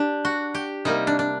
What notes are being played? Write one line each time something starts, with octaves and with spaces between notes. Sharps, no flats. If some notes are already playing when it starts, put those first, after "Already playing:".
Already playing: D4 G4
F#4
G4
C3 G3 A#3 D#4
D4
D4